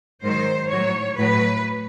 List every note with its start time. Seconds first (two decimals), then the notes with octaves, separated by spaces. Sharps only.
0.22 G#2 D#3 F#3 C5
0.71 A2 F#3 C#5
1.18 A2 F#3 B4